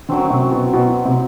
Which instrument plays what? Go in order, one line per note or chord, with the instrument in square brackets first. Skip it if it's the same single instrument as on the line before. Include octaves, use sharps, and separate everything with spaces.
[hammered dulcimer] F#2 F#3 C4 [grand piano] D3
[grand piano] C3
B2
B2
B2
C3